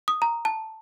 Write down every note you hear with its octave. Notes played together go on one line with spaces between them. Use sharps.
D#6
A#5
A5